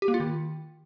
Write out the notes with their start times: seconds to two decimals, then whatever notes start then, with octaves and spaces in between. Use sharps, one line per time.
0.02 G4
0.08 A#3
0.14 F4
0.20 D#3